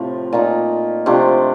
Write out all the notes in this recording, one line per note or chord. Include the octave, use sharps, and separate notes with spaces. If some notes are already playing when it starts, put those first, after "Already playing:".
Already playing: A2 C3 F3 A3
A#2 A3 D#4
C3 F3 A3 D4